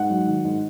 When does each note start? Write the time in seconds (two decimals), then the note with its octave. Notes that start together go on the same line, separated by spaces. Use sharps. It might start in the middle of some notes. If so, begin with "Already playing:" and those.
Already playing: G#2 F#5
0.10 F#3
0.27 D#3
0.44 G#2